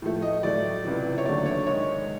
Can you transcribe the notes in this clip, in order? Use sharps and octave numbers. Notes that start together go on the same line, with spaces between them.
A2 F3 A3
D#5
A2 F#3 A3 D5
C#2 C3 E3
C#5
D#2 D3 F#3 A3 D5
C#5
G#2 D#3 G#3 C#5